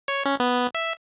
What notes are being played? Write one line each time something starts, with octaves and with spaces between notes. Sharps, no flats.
C#5
C#4
B3
E5